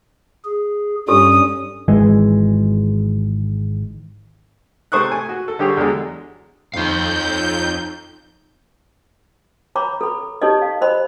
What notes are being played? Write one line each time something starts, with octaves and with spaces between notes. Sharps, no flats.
G#4
G2 G3 C#4 G4 A4 D#6
G#1 E3 G#3
C3 A3 C5 C#6 D#6 F#6
G#5
F#4
A4
D3 G3 G4 G#4 C#5
E2 D3 F#3 G#3
F2 D#4 F5 G6
C#5 A#5 B5 D6
A4 B5
D#4 G4 A4 C#5 D#5
F5
C5 D#5 B5 C6